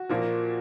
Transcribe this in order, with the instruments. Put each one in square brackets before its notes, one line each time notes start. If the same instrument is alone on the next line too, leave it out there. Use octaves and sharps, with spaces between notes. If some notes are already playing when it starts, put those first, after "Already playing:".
Already playing: [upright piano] F#4
A#2 F3 A#3